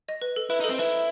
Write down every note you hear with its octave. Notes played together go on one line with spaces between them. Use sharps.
D#5
B4
A4
E4 B4
D#4 A4
C4
E4 B4